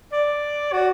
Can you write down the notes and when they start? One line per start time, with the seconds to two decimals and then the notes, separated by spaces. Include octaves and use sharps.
0.12 D5
0.72 F#4